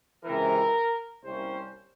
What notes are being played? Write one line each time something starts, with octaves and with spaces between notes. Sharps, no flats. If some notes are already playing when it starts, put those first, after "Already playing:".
C#2 C3 E3 A#4
C2 C3 G3 A#3 C#4 C5